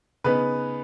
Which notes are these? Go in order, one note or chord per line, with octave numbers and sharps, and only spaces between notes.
C#3 B3 D#4 B4